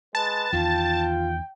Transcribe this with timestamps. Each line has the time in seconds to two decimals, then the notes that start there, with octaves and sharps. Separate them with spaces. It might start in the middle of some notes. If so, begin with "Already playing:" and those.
0.15 G#3 B4 A5
0.53 E2 D#3 F4 G5